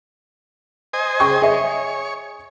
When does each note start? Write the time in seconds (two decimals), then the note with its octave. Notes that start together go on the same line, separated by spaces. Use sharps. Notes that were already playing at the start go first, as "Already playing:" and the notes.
0.93 C5 D#5 G#5
1.20 C#3 G5 C#6
1.42 G#4 C#5 D#5 E5